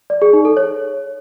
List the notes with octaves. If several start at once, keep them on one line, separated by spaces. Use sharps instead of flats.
D5
G#4
D#4
A4
C#5